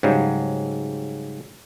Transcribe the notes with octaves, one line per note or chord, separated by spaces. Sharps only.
G#2 C#3 F#3 G3